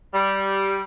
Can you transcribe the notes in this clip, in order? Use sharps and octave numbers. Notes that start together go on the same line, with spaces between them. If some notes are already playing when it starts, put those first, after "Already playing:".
G3